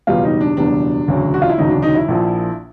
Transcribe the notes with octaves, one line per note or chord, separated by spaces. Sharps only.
F#1 E2 B2 G3 F4
D#4
D4
F#1 E2 B2 G3 D4
E1 D2 C#3 F#3
F#4
F4
E4
E1 D2 C#3 F#3 D#4
D4
D#4
E4
A#1 A#2 F3